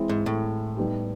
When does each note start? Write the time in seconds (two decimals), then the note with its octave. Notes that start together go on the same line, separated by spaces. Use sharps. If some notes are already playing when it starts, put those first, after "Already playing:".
Already playing: E3 G#3 C4 E4
0.09 G#2
0.26 A2
0.77 G3 B3 D#4 G4